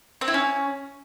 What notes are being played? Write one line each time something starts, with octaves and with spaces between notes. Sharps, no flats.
C4
E4
C#4